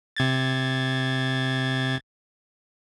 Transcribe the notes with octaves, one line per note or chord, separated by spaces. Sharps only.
C3 G#6 A6